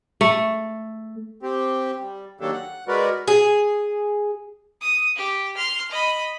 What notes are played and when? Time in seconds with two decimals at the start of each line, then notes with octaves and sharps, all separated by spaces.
0.21 A3
1.43 C4 G4
2.00 G3
2.40 D#3 F#3 A#3 D4 G4 A4
2.52 F#5
2.88 G#3 F#4 A#4 B4 D5
3.27 G#4
4.81 D#6
5.16 G4
5.56 C6 F6
5.91 D#5 B5